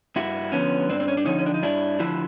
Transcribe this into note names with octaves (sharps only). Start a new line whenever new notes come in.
G2 E4 F#4
D3 F3 B3 C#4
G2 C4 D4
C4
C#4
D4
D3 F3 C#4 D#4
C#4
D4
D#4
G2 D4 E4
D3 F3 E4 F#4